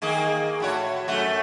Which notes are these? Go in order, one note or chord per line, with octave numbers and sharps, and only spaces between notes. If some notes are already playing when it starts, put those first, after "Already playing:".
D#3 A#3 G#4
A2 F#4 C#5
F#2 A3 F#4